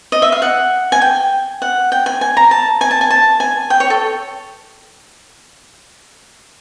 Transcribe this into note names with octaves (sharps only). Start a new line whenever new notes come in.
D#5
E5
F5
F#5
G#5
G5
F#5
G5
G#5
G#5
A#5
A5
G#5
A5
G#5
A5
G#5
G5
C#5
A4